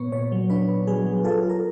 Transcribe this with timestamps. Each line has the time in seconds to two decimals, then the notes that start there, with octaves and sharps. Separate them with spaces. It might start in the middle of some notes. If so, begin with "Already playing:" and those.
Already playing: A#2 B3 C#5
0.12 A#2 C#5
0.32 F#3
0.50 D4 B4
0.68 A#2
0.87 F#3 G#4
1.06 F#3
1.24 F4 A4
1.43 F4
1.49 A#4